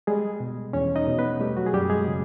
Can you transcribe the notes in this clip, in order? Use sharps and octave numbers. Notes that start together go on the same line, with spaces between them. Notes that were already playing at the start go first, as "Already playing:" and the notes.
G3 G#3 G#4
B2
E2 C#4 C#5
D#4 D#5
B2
B3 B4
G3 A3 G4
F#3 F#4
G#4
F#2 G3 G4
G#3 G#4
C#3